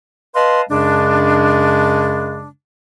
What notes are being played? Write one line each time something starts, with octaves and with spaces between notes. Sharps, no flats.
B4 D#5 F5 A5 C6
F#2 C#3 G#3 D4